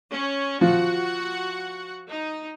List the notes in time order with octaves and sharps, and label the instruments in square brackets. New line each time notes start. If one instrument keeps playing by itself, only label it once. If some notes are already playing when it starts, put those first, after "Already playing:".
[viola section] C#4
[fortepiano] F3 [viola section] F#4 F#5
[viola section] D#4